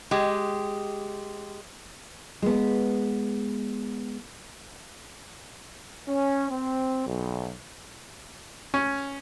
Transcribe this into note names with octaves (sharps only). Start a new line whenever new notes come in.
G#3 G4
G#3 B3
C#4
C4
B1
C#4